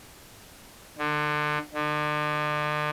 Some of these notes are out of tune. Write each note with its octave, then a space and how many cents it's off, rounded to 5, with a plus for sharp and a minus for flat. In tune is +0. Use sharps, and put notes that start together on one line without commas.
D3 +30
D3 +40